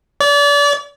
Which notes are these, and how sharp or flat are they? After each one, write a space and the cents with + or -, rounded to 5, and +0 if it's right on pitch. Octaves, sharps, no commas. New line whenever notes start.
D5 -35